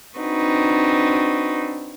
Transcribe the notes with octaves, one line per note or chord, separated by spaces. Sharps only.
C4 D4 D#4 F#4 B4